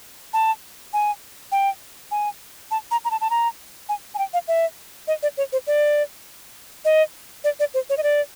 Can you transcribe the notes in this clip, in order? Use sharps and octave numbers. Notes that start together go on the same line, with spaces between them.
A5
G#5
G5
G#5
A5
A#5
A#5
A5
A5
A#5
G#5
G#5
G5
F5
E5
D#5
D5
C#5
C5
D5
D#5
D5
D5
C5
C#5
D#5
D5